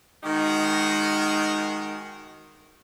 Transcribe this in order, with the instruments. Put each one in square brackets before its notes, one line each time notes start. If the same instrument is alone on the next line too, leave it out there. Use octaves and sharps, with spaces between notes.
[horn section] D#3 G#3 D#4 F#4 A#4